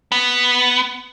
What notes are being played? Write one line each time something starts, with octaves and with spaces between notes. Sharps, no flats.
B3